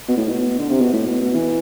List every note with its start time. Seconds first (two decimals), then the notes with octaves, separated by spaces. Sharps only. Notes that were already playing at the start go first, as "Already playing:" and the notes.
0.08 B2
0.17 A2
0.29 B2
0.59 D3
0.70 C3
0.81 B2
0.93 A2
1.07 B2
1.22 B2
1.35 E3